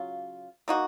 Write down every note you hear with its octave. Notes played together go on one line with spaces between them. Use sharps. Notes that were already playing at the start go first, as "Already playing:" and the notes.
Already playing: C#3 F#3 F4
A#3 D#4 F#4